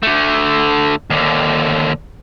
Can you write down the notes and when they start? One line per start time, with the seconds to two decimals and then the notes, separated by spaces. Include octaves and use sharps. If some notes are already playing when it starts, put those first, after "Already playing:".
0.03 D3 A3
1.10 D#2 D3